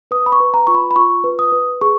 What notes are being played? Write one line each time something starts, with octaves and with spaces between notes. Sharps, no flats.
B4 D#6
B5
C#6
B4
A#5
F4 C#6
B5
B5
F4 C#6
B4
D#6
B4
G#4 C#6